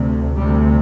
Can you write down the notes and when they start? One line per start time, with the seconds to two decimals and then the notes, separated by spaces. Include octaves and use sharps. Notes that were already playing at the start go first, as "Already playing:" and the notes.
Already playing: D2 C3
0.36 D2 C3 G3